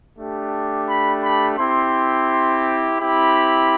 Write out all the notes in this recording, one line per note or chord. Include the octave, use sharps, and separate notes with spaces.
A3 D4 G4
B5
B5
C4 E4 G4 C6
C4 E4 G4 B5